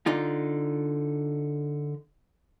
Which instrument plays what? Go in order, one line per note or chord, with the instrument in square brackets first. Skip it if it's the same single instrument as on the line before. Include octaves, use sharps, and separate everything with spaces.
[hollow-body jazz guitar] D3 D#4 F4